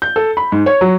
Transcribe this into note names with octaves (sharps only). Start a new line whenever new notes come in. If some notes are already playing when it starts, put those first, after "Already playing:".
G6
A4
B5
G#2
C#5
F#3